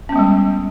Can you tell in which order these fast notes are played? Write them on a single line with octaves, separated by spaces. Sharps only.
C#4 B3 G#3 G3